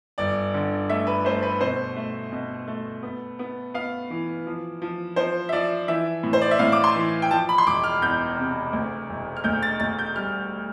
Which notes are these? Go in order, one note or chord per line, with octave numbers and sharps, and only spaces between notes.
G1 D5
D3
A3 E5
B4
A3 C5
B4
B2 C5
A3
B2
A3
B3
B3
B3 F5
E3
F3
F3
F3 C5
E5
F3 D5
E3 E5
A2
C5
D5
E5
A2 F5
D6
C6
E3
G5
F3 A5
B5
C6
E1 D6
F6
E2 G6
C3
D2
E1
F6
D2 G6
A6
D2 A6
G6
G3 F6